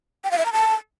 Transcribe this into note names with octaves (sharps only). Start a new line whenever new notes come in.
G5
F5
E5
A#5
A5